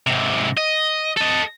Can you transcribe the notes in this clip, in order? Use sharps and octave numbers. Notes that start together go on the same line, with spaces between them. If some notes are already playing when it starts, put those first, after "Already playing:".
G#2 C3
D#5
A4 D#5